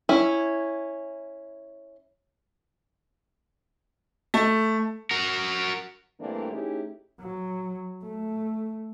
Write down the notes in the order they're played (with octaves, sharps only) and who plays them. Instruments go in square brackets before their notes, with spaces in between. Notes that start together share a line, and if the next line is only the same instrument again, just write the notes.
[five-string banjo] C#4 E4
[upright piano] A3
[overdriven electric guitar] F#4 A#4
[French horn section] G2 E3 A3 A#3 C4 D4
A3 C#4 D#4 E4 G4 G#4
[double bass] F#3
A3